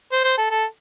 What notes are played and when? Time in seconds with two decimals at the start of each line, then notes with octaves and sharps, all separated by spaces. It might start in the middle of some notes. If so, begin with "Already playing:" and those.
0.12 C5
0.24 C5
0.38 A4
0.51 A4